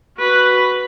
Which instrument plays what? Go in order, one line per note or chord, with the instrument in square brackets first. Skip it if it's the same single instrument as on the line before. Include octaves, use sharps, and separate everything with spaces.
[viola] F#4 B4